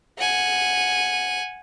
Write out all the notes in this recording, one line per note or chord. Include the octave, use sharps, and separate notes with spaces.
F#5 G#5